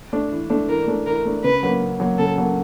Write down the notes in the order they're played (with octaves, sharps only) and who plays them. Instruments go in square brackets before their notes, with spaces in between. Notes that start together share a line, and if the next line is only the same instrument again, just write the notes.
[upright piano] A3 D4
E3
A3 D4
[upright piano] E3 [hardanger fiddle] A#4
[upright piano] A3 D4
[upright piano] E3 [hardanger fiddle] A#4
[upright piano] A3 D4
[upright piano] C#3 [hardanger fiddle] B4
[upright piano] F#3 A#3
C#3
F#3 A#3
[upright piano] C#3 [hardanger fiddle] A4
[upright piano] F#3 A#3